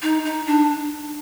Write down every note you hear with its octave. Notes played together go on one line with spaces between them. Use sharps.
D#4
D#4
D4